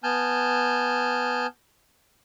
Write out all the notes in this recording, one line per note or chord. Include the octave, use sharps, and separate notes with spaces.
B3 G#5 A5 F6 G6